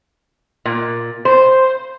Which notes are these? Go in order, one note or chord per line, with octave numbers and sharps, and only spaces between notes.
A#2
C5